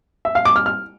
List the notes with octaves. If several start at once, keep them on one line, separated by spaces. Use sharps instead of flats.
E5
F5
D6
F6
F6